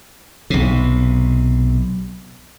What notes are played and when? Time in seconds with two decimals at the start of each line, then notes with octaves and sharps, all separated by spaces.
0.50 B1 C3